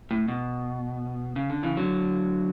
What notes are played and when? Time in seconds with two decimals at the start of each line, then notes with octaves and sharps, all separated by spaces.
0.11 A2
0.28 B2
1.36 C#3
1.50 D3
1.63 C#3 E3
1.76 D3 F#3